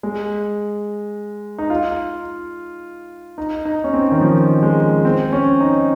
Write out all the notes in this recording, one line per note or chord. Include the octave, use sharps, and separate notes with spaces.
G#3
D#4
F4
D#4
D#4
C#4
C4
D#3
F3
G#3
C4
C#4
D#4